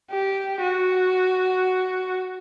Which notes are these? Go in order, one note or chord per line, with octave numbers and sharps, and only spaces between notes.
G4
F#4